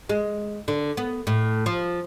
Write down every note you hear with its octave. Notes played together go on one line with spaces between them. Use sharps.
G#3
D3
B3
A2
F3